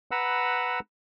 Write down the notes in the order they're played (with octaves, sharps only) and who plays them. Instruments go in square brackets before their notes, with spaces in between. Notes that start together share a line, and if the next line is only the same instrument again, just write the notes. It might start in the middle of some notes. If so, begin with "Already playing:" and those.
[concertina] B4 F#5 A#5 B5 E6